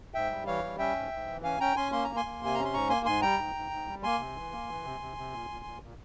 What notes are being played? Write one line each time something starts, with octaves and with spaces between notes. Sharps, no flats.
G#2 E5 G5
G3
E3 C#5 F5
G3
C#4 E5 G5
G#2
G#2
E3
C#4 F5 G#5
C#4 G5 A#5
C#4 G#5 C6
A#3 C6
A#3 A#5
G#5 C6
A#3
C3 G#5
C#4 A#5
C6
G#2 A#5 C#6
A#3 G#5 C6
G#2 G#5 C6
G3 G5 A#5
G#2
G#2
G#2
G3
A#3 G#5 C6
C3
E3
A#3
E3
C3
C3
C3
A#2
A#2
A#2
A#2